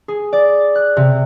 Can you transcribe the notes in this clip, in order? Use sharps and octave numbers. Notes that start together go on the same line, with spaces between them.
G#4
D5
F#6
C3